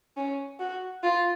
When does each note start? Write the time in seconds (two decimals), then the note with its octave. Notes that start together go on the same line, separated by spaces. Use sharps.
0.17 C#4
0.60 F#4
1.03 F4